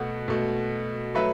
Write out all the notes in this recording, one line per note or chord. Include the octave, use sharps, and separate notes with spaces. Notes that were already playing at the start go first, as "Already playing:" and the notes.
Already playing: B2 A3 F#5
B2 A3
F#3 A3 B4 E5